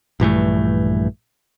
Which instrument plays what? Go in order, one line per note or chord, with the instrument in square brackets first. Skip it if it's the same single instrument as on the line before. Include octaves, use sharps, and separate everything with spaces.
[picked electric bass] A#1 G2 E3 A3